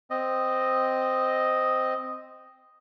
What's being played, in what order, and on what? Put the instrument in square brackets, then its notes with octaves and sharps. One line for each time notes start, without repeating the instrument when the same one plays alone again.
[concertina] C4 D#5